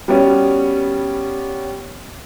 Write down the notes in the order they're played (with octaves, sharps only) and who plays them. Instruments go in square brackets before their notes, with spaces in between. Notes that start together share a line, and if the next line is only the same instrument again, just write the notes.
[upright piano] G3 B3 C#4 F#4